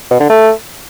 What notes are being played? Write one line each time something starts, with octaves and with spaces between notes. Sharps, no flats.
B2
D3
A3